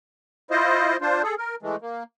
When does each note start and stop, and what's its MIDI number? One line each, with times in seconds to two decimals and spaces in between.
0.51 0.97 64
0.51 0.97 65
0.51 0.97 72
0.51 0.97 75
1.01 1.22 62
1.01 1.22 65
1.01 1.22 72
1.23 1.35 68
1.23 1.35 69
1.38 1.55 70
1.62 1.76 52
1.62 1.76 56
1.62 1.76 57
1.81 2.03 58